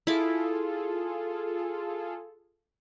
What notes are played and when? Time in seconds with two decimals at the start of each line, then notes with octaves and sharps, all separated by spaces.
0.07 E4 F4 G#4 A4 D6